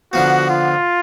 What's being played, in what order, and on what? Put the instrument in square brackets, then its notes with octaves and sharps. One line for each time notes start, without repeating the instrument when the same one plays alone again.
[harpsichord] D3 F3 B3 [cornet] F#4
[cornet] F4